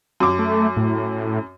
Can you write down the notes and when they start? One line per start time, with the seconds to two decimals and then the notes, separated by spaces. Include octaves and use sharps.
0.20 F#2 D6
0.39 A3
0.77 A2